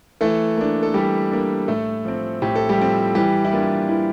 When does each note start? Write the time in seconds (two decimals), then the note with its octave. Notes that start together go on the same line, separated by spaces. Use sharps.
0.21 E3 A3 A4
0.57 A#3 D4
0.83 A4
0.94 E3 G3 G4
1.31 A#3 D4
1.68 A2 A3 A4
2.05 F3 C4
2.42 A2 G4
2.56 A4
2.69 G3 G4
2.78 F3 C4
3.15 E3 G3 G4
3.45 E4
3.52 A#3 D4 F4
3.89 E3 E4